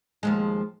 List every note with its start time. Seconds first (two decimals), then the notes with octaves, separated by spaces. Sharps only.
0.23 D#2 F3 G#3